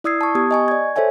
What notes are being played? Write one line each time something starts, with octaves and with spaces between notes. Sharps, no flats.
E4 D5 D#6 E6 G#6 C7
A5 C#6
B3 G4 D#6 G#6
D#5 G#5 C#6
D5 G#6
A4 C5 C#5 E5 G#5